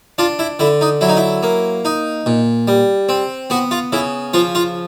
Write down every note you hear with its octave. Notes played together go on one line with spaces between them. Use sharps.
D4 F4
E4
D3 E4
D#4
F#3 E4
D#4
E4
A#3
D#4
A#2
G3
C4
B3 F#4
F4
C#3 E4
F3 F4
F4